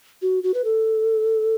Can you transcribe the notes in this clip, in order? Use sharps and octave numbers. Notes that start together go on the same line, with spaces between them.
F#4
F#4
B4
A4